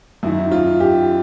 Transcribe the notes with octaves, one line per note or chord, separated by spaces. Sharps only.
F#2 D#3 F#3 E4
F4
G4